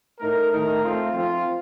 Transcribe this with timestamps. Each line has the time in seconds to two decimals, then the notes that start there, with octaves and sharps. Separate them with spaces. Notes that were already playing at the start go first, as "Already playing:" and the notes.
0.19 A2 A3 D#4 A#4
0.51 D#3 A3 D#4 A#4
0.82 A3 C4 F4
1.13 F3 C4 F4